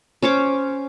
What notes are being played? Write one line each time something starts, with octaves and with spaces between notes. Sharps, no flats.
C#4 C5 C#5 D6